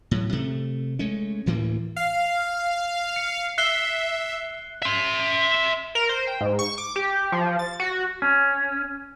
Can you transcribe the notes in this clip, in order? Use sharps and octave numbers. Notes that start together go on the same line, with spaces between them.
A2 F#3
C3 A3
G#3 A3 C#4
D2 A2 E3 A#3
F5
C#7
E5 F#6 C7 G7
E5 C6
A#4
C5
G5
G#2
C#6
D6
G4
F3
A6
F#4
C#4